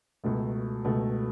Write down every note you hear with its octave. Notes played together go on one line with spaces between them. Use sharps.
C#2 B2 A3
C#2 B2 A3